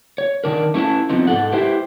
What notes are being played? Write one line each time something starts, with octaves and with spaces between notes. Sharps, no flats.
C#5
D#3 D4 A#4
A3 C#4 E4 B4 A5
F3 B3 C4 D#4
G#2 A4 F#5
E4 G4 B4 C5 E5 G5